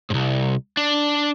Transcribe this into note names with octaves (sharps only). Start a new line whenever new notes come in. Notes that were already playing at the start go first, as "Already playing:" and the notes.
C2 G#2
D4